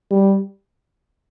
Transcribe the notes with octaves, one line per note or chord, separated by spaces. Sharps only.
G3